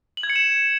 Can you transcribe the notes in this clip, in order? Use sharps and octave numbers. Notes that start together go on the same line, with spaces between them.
F#7
G#6
C#7
E7